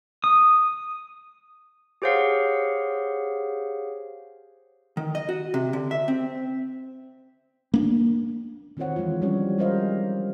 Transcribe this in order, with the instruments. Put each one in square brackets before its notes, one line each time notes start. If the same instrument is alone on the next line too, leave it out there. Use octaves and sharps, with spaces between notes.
[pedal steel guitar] D#6
[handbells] G4 G#4 C5 C#5 F5 F#5
[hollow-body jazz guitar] D#3
D#5
F#4
C3
D3
E5
C4
[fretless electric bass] A#3 D4
[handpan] D#3 C4 F4 C5 C#5 F#5
E3 F3 G#3 F4
G3 C#4 D4 G4 C#5
G#3 G4 A#4 C5 D#5 F5